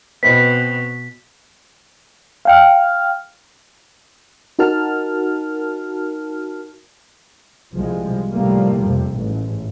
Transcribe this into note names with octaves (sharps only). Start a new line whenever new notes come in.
B2 C4 B4 D#5 B6
F5 G5 F6
D#4 F#4 A#4 A5 F6
C2 F3 G#3
C2 A2 F3 G3 A3 A#3
F2 C3
A1 G#2